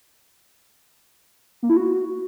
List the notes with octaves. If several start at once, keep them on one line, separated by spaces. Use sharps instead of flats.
A#3
E4
F#4